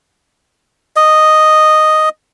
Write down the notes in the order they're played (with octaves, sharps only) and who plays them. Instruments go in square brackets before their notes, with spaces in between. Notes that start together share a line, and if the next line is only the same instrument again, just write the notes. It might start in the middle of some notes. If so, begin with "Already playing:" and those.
[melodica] D#5